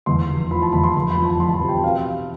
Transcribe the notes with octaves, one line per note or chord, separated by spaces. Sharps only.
E2 C6
F1
F3 B5
A5
E2 B5
C6
F1 B5
B5
F2
A5
F2 C6
A5
B5
C3
G5
B2 F5